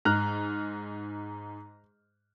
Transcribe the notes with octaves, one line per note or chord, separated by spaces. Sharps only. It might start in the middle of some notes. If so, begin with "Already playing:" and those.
G#2 A#5 F6 F#6